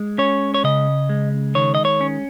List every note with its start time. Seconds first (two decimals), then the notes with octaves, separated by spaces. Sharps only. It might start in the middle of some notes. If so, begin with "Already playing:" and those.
Already playing: G#3
0.18 C#4 C#5
0.54 C#5
0.64 C#3 D#5
1.09 G#3
1.55 D#3 C#5
1.75 D#5
1.85 C#5
2.01 C#4